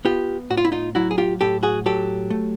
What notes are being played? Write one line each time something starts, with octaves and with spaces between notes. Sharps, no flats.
B3 F4 G4
A2 F#4
F4
E4
D#4 F4
F#3 E4 F#4
G#4
F4 G4
A2 G4 A4
F#4 G#4
F#3 G4 A4
A3